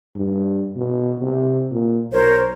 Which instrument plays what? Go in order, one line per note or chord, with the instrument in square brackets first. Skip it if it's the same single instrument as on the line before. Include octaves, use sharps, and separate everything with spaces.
[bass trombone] G2
B2
C3
A#2
[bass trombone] B1 [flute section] A#4 C5 C#5